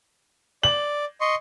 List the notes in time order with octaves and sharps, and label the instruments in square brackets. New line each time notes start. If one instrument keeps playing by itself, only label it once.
[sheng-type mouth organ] D5 [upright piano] F#7
[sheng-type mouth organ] D#5 C6 C#6